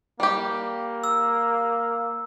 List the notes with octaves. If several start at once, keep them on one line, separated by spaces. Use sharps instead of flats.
G3 A#3 G4
E6